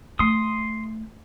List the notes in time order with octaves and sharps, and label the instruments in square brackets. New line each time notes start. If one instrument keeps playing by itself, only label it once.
[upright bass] A3 [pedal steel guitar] C6 D#6